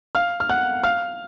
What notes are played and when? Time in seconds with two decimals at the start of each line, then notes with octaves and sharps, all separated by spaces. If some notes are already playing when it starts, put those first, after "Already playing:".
0.15 F5 F6
0.40 F6
0.49 F#5 F#6
0.83 F5 F6